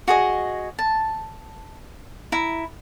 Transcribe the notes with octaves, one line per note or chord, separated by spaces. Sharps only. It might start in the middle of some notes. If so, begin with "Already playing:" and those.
F#4 G#4 D#5
A5
E4 A#5